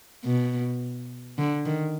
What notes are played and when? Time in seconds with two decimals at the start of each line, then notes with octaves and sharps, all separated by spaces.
0.25 B2
1.38 D3
1.66 D#3